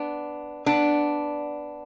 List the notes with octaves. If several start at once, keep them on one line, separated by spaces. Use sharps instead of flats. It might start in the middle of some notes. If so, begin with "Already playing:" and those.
Already playing: B3 D4
B3 D4